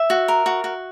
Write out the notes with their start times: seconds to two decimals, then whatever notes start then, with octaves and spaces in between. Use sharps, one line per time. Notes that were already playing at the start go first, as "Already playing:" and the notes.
Already playing: E5
0.10 F#4
0.28 A#4
0.46 F#4
0.64 F#4